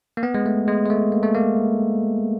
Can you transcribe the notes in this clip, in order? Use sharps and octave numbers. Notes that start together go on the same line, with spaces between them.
A#3
B3
G#3
A3
G#3
G#3
A3
A#3
A3
A#3